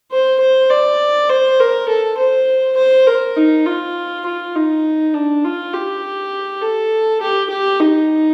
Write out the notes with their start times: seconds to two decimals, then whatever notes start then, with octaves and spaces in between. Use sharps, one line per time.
0.12 C5
0.40 C5
0.70 D5
1.29 C5
1.59 A#4
1.89 A4
2.17 C5
2.77 C5
3.07 A#4
3.36 D#4
3.66 F4
4.26 F4
4.55 D#4
5.14 D4
5.44 F4
5.73 G4
6.62 A4
7.21 G4
7.50 G4
7.80 D#4